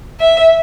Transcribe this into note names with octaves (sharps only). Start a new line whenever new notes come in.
E5